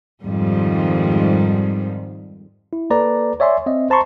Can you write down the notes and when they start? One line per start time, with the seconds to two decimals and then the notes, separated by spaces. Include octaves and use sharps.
0.21 F2 G#2 D#3 G3
2.73 E4
2.90 A#3 A4 B4 D5 A#5
3.40 C#5 D5 E5 G#5 C6
3.66 C4 D#5 E5
3.90 C5 A5 A#5 C6 C#6